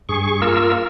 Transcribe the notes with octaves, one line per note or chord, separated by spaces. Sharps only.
G2 G#4 C#6
A#3 F4 A#4 E6